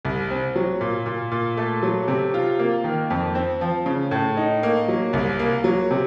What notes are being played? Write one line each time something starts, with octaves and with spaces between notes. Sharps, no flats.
C2
C4
F#3
A#2
A#2
A#2
A3
F#3
C3
F4
A#3
D#3
F2
C4
F3
C#3
A2
D#4
A#3
F#3
C2
A#3
F#3
C3